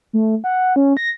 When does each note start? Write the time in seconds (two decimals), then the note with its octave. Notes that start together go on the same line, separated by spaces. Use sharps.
0.13 A3
0.44 F#5
0.76 C#4
0.97 A#6